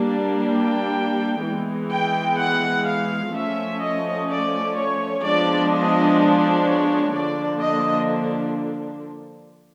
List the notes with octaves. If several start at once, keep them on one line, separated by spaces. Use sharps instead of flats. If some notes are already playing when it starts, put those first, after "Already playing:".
Already playing: G3 A#3 D4
G5
E3 G#3 B3
G5
F#5
F5
F3 A3 C#4 E5
D#5
D5
C#5
F3 G#3 B3 D4 D5
D#5
C#5
D3 F3 A#3 D4 D5
D#5